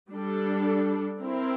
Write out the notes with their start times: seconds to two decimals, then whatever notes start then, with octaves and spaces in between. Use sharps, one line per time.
0.10 G3 D4 A4
1.20 C4 E4 A#4